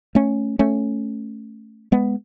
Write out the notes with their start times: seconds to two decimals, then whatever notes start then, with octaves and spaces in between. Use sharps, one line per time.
0.15 A3 C#4
0.59 A3 C#4
1.92 G#3 B3